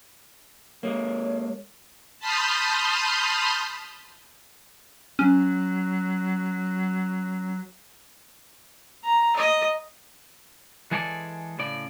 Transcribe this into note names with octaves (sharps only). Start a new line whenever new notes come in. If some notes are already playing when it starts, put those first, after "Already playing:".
G#3 A#3 C#5
A5 B5 C6 D#6 F6 G6
F#3 C#4
A#5
D#5
E3 G#3 G#4 A4 C5 D5
A2 C#3 D5